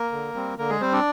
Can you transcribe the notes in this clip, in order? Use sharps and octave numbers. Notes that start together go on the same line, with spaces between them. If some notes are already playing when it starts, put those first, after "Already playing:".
Already playing: A#3 A#4
D3
G3 C4
D3 A#3 A#4
G#3 G#4
G3 C4 C5
D4 D5